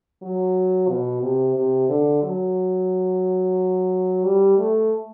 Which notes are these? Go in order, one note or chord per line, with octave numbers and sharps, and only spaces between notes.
F#3
B2
C3
C3
D3
F#3
G3
A3